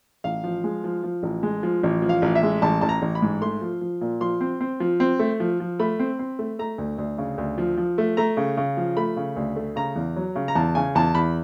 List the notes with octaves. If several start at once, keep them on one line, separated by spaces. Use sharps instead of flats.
A1 F5
F3
G#3
F3
F3
A1
G#3
F3
A1
F3
F5
A1
E5
G#3
A1 A5
A1 A5
A#5
A1
B5
G#2
A3 C6
F3
F3
A#2
F3 C6
C4
C4
F3
C4
A3
F3
F3
A3 B5
C4
C4
A3
A3 A#5
D2
D2
C#3
D2
F3
F3
A3
A3 A#5
C#3
C#3
F3
A3 B5
C#3
D2
A3
C#3 A#5
E2
F#3
C#3
A#5
E2 A5
C#3 G#5
E2 A5
E2 B5